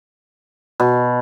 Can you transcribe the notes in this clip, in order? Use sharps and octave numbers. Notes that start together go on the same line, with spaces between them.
B2